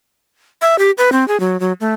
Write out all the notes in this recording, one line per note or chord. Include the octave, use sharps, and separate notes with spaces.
E5
G4
B4
C4
G#4
F#3
F#3
A3